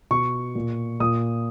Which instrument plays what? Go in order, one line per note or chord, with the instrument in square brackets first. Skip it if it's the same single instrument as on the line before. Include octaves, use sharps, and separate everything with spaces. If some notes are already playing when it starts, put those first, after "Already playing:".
[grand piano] B2 C#6
A#2
A#2 D#6